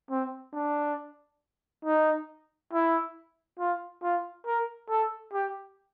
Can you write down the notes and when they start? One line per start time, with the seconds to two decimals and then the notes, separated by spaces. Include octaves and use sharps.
0.11 C4
0.54 D4
1.85 D#4
2.73 E4
3.59 F4
4.03 F4
4.46 A#4
4.90 A4
5.33 G4